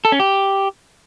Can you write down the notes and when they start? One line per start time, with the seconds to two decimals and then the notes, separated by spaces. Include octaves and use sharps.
0.05 A4
0.12 C#4
0.20 G4